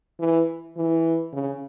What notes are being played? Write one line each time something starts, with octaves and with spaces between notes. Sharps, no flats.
E3
E3
C#3